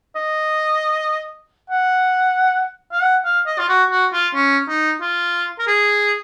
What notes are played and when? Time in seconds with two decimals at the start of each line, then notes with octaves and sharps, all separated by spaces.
0.16 D#5
1.70 F#5
2.92 F5
3.02 F#5
3.25 F5
3.46 D#5
3.59 F4
3.69 F#4
3.91 F#4
4.13 F4
4.34 C#4
4.68 D#4
5.01 F4
5.59 A#4
5.67 G#4